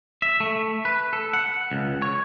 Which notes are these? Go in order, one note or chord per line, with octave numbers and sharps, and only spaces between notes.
E5
A3
B4
A4
F#5
C#2
C#5